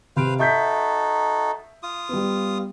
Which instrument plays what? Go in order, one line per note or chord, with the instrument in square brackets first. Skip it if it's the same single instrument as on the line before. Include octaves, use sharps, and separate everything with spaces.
[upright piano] C3 D7 [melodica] B4 C5 F5
[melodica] D#4 F#4 A4 [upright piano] E5 G6 B6
[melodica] F4 D#6
[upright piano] G3 B3